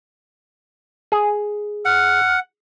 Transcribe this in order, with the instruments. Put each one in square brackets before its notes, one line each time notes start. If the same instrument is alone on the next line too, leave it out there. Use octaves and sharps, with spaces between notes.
[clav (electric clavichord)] G#4
[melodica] F#5 [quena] F6